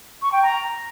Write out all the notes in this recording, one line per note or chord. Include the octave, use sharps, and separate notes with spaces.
C#6
G5
A#5